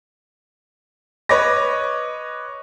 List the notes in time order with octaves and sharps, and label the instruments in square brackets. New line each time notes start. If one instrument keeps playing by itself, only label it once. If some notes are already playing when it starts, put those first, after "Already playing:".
[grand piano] B4 C#5 D#5 D6 A#6